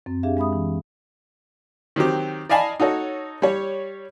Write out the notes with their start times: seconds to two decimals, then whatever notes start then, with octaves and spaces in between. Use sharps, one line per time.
0.06 F#2 C4
0.23 D4 G4 G#4 E5 F5
0.37 G#3 E5 B5 D#6
0.53 E3
1.96 D#3 F#3 C4 G4
2.49 D5 D#5 F5 G#5 A5 B5
2.80 D#4 F#4 A4 C#5
3.42 G3 C#5